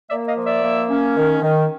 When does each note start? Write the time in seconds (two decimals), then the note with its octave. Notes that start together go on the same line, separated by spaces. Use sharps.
0.10 A#3 D5 E5
0.28 D#5 F5
0.37 F3
0.46 D5 E5
0.63 A#3
0.89 C#4
1.17 D#3
1.42 D#3